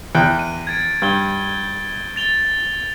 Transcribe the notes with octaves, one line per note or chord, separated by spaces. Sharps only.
E2 G5 F#6
D#7
G#6 A6 D7
G2 G6 G7
A6 F7 G7